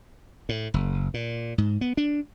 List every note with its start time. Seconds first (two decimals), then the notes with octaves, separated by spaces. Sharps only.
0.49 A2
0.74 F#1
1.14 A#2
1.58 G#2
1.81 B3
1.97 D4